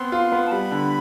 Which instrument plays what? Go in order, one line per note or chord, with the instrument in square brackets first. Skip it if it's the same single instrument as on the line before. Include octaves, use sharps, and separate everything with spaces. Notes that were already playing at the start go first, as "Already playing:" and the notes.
Already playing: [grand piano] B3 C4 [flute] C6
[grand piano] F4
B3
[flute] A5
[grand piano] G3 [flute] B5
[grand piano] D3